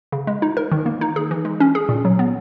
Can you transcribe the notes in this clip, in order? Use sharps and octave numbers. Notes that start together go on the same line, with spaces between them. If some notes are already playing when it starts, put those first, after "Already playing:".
C#3
G#3
D#4
A#4
D#3
A#3
D#4
G#4
E3
G#3
C#4
G#4
A#2
F#3
B3